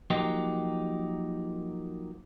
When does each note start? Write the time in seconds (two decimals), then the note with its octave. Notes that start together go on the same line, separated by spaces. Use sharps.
0.10 F3 F#3 A#3 D#4 G4